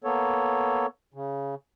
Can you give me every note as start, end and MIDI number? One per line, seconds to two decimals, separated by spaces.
0.04 0.86 58
0.04 0.86 59
0.04 0.86 69
0.04 0.86 73
1.14 1.55 49